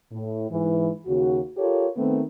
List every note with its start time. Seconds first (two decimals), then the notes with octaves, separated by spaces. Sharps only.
0.12 A2
0.49 G#2 E3
1.06 D#2 C#3 F#4
1.57 F4 G4 A4 A#4 C#5
1.97 D#3 A3 B3 C4